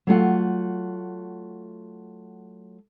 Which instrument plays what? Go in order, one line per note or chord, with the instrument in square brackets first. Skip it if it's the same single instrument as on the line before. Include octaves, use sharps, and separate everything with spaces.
[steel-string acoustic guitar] F#3 A3 F4 F#5